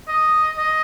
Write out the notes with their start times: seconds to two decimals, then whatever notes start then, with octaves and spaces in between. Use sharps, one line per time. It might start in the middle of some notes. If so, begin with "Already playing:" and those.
0.08 D#5
0.58 D#5